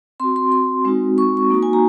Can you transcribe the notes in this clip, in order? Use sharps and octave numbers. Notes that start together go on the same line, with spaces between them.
C4 F#4 C6
C6
C6
G#3 C4 D#4 F#4
C#6
C#6
A#3 D#4 F#4
G#5
A#5